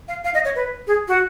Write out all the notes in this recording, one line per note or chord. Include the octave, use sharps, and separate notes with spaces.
F5
F5
D#5
C#5
B4
G#4
F#4